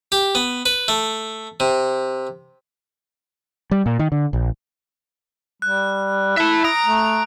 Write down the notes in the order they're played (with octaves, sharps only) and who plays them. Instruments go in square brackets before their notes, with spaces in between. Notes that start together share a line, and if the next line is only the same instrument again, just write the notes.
[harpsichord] G4
B3
B4
A3
C3
[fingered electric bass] G3
A#2
D#3
D3
A#1
[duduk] G3 [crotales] F#6
[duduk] E4 [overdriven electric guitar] E5 A5
[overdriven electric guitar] A#5 [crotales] D#6 D7
[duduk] A3